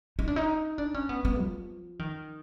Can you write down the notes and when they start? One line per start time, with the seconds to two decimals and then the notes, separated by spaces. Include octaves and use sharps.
0.19 D#4
0.28 D4
0.36 D#4
0.78 D4
0.94 C#4
1.09 B3
1.25 B3
1.39 F3
1.99 D#3